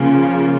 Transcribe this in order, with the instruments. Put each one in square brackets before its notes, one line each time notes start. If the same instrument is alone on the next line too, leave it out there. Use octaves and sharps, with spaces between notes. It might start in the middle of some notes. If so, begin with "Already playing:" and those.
Already playing: [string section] C#3 F3 [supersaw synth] A#3 F4